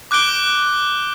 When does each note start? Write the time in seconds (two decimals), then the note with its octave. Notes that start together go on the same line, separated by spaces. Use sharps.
0.11 D6 F#6 G6 D7 G7